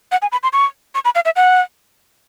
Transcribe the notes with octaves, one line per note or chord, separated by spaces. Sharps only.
F#5
G#5
B5
C6
C#6
C#6
B5
F5
E5
F#5